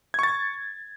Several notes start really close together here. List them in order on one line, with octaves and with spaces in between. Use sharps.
G#6 C#6 A6